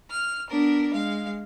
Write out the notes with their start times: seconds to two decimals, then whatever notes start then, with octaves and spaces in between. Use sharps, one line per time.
0.11 F6
0.51 B3 D4 A#4
0.92 G#3 F5